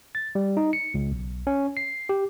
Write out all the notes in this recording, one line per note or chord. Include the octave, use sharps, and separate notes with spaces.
A6
G3
D#4
C#7
C#2
B1
C#4
C7
G4